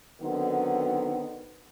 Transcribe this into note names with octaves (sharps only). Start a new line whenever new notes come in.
D3 D#3 F#3 B3 C4 D#4